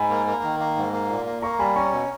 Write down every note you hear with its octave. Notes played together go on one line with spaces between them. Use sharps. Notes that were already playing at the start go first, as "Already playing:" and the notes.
Already playing: G#2 G#5 B5
A#3
A#3
D#3
A#3
G#2
A#3
A#2
A#3
A#3 A#5 C#6
G3 G#5 B5
C#4 A#5 C#6
B2